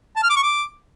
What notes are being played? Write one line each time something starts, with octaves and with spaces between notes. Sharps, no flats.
A5
F6
D6
C#6
D6